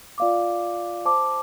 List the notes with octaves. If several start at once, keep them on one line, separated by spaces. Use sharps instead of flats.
F4 D5 F5 D6
C5 A5 D6